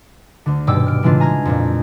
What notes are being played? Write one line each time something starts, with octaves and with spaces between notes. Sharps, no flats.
D2 D3
D#1 G2 B2 G5 D6 E6
F6 D7
A2 C#3 E3 G#3 D4 F4
G#5 A#5 F6 G#6
F2 A#2